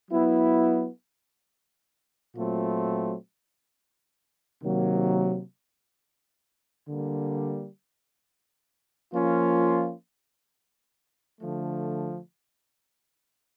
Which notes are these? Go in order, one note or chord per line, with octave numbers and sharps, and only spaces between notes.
F#3 B3 E4
A#2 F#3 A3 C4 F4
C3 D#3 F#3 A#3
D3 G3 A#3
F3 A#3 C#4 F4
D3 F3 A3